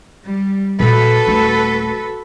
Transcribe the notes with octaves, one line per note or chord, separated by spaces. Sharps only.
G3
A#2 F#4 A4 B4
D#1 A3